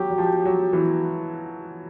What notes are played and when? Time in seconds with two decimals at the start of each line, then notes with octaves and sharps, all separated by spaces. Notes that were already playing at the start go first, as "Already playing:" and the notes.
Already playing: F#3 G4
0.10 F#3
0.18 F3
0.45 F#3
0.73 E3